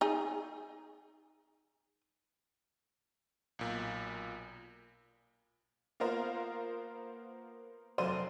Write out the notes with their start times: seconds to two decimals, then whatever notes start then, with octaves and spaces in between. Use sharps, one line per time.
0.01 D#4 G#4
3.59 B1 A#2
6.00 A#3 B3 F4 A#4 C5 F5
7.98 F1 F#3 C5 D5 C6 D#7